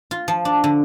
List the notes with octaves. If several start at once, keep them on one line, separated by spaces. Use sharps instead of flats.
F4
F3
D4
D3